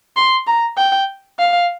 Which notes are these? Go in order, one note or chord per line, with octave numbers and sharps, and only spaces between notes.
C6
A#5
G5
F5